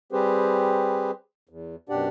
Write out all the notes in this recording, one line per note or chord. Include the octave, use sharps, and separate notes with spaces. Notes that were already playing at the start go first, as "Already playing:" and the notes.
G3 C4 G4 G#4 B4 C5
E2
F#2 B2 D4 G4 D5 F#5